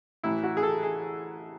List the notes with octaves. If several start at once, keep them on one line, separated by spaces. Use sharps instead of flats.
A1 A2 E3 E4
F#4
G#4
A4
G#4